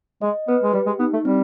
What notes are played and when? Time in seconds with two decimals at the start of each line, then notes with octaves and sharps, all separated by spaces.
0.22 G#3 D#5
0.48 B3 B4
0.63 G#3
0.73 G3 G4
0.86 G#3
0.99 B3 D#4
1.13 A3
1.25 G3 C4